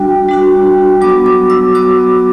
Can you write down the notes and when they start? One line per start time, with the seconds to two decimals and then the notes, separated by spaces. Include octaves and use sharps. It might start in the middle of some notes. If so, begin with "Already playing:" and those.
Already playing: G3 D4 F#4 G5
0.28 G3 D4 F#4
1.01 F#3 B3 F#4 D6
1.26 D6
1.50 E6
1.75 F#3 B3 F#4 D6